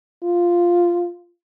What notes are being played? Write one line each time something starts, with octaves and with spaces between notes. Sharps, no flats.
F4